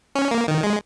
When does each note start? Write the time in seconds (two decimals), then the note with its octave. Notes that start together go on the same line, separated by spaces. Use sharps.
0.15 C#4
0.31 A#3
0.48 D#3
0.63 G#3